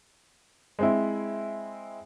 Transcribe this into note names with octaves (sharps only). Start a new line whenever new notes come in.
G#3 C4 E4